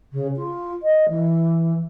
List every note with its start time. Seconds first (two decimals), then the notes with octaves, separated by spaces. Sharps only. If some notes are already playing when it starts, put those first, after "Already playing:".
0.12 C#3
0.36 F4
0.82 D#5
1.08 E3